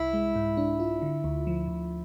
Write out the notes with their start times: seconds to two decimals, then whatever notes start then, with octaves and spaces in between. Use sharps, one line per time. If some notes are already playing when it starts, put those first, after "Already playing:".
Already playing: C2 E4
0.13 G#3
0.36 G#2
0.57 D4
0.80 F4
1.02 D3
1.24 D2
1.47 F3
1.68 D2